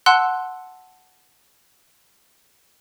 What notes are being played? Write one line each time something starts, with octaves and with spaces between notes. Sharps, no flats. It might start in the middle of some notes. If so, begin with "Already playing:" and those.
F#5 A5 C6 E6 F#6